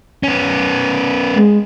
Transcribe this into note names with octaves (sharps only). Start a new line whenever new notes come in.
B3 C#4
G#3